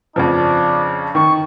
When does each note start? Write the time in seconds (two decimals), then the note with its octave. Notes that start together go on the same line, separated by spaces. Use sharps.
0.16 F2 C#3 F3 D4
1.15 D#3 C#6